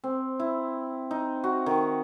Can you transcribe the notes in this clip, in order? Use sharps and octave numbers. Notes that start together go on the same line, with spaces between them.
C4
E4
D#4
F#4
D#3